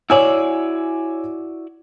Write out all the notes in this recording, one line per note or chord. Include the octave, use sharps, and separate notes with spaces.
E4 F#4 C#5 D5 G#5 E6